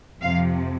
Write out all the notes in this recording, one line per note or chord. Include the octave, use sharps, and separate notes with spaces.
F2 C3 F3 F5